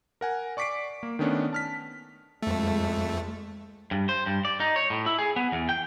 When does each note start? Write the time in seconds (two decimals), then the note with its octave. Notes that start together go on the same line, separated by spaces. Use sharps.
0.21 A#4 F#5 G#5
0.57 D5 C#6 D6 B6 C7 D7
1.03 A#3
1.19 D#3 A3 B3 C#4 D4
1.53 A5 F6 B6
2.43 F2 G#3 A3
3.91 G2
4.09 C5
4.26 G2
4.45 D5
4.60 D#4
4.76 C#5
4.90 A2
5.06 E4
5.19 G#4
5.36 B3
5.52 E2
5.69 G5